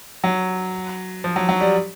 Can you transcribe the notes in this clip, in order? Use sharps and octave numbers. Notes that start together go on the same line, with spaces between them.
F#3
F3
F#3
F#3
G3